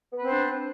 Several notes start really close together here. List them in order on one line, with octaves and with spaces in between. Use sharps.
B3 B4 C4 C5 D4